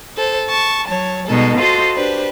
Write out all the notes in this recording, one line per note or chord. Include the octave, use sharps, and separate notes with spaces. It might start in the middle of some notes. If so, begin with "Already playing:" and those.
A4 C5
A5 C#6
F#3 C#5 A5
B2 G3 G#3 D#4 A4
F4 F#4 A4 C5 D#5
D4 G4 B4 C5